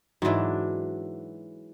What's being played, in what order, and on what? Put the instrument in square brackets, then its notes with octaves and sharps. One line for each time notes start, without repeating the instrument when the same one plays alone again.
[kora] G#2 E3 [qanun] F#3 D4